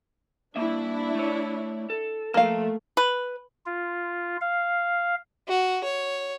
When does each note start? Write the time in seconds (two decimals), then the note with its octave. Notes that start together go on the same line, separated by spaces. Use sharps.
0.56 G2 A#3 D4 E4 E5
1.15 A3 C#5
1.90 A4
2.34 F3 A3 A#3 A4 F5
2.97 B4
3.66 F4
4.41 F5
5.48 F#4
5.84 C#5